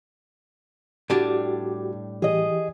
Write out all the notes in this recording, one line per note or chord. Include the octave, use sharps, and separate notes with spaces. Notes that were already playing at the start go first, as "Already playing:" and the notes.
A2 G3 D4 F#4 G4
E3 G4 G#4 D#5